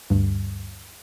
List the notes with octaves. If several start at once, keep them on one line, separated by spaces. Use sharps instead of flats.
D2 G2